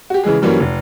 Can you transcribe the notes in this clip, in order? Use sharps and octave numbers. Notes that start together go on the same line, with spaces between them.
F#4 G4
C#3 E3 G#3 G#4
G2 E3 F#3 G3 A#3 C#4
F1